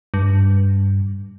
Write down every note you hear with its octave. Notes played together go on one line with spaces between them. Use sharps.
G2